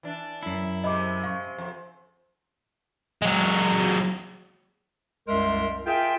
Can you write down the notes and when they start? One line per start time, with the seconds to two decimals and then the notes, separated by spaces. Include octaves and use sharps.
0.03 E3 D4
0.43 F#2 E4
0.84 C3 G#3 D#5 B5 D6
1.23 F5 C#6
1.58 F2
3.22 F#3 G#3
5.28 C2 F#2 G#3 A#4 E5 C6
5.86 F4 G#4 A#4 E5 G5